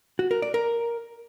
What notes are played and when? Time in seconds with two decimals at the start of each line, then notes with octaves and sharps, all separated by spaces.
0.19 F#4
0.31 A#4
0.42 D5
0.54 A#4